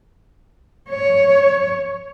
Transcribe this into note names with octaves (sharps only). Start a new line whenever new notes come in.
C#5